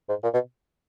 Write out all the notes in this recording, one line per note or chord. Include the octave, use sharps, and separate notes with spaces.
G#2
A#2
B2